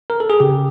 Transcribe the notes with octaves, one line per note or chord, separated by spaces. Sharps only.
A#4
A4
G#4
C#3 G4